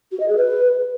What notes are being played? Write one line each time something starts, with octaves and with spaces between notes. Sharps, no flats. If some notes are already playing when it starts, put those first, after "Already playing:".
F#4
D#5
G#4
B4